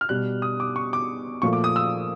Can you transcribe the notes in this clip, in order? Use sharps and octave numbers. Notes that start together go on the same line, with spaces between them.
F6
B2 G3 F#6
D#6
D6
C#6
D6
A#2 F3 A3 C#6
D6
D#6
E6